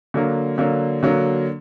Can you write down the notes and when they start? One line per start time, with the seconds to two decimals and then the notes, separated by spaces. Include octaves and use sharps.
0.14 D3 F#3 A#3
0.58 D3 F#3 A#3
1.03 D3 F#3 A#3